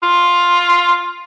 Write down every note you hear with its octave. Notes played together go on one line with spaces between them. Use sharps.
F4